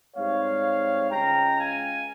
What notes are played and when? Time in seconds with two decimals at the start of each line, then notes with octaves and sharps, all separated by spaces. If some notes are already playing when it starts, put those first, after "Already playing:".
0.16 G#2 G3 C4 C#5 F5
1.11 C#2 C#3 G#3 G5 A#5
1.58 F5 G#5